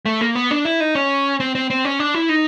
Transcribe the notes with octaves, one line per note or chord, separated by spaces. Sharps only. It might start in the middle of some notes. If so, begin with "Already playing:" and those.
A3
A#3
B3
D4
E4
D#4
C#4
C4
C4
C4
C#4
D4
E4
D#4